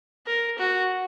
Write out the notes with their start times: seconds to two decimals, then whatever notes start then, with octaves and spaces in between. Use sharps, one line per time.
0.26 A#4
0.58 F#4